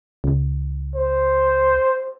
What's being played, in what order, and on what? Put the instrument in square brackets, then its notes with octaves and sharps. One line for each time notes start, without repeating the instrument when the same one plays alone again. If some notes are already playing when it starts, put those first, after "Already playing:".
[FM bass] C#2
[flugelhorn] C5